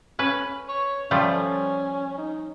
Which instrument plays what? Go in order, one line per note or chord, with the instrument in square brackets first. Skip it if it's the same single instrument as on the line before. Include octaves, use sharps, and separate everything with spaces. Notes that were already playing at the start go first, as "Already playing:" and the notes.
[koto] C#4 B4
[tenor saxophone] C#5
[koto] F3 G3 A3 [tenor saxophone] C#4
[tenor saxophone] D#4